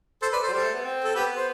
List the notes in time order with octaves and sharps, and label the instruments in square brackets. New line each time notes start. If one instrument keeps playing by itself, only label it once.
[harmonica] A4 C5
B4 D5
A4 C5
[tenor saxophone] F#3
[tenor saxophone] G3 [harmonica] A4 C5
[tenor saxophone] A3
B3
C4
[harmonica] A4
[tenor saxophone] B3 [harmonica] G4 B4
[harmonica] C5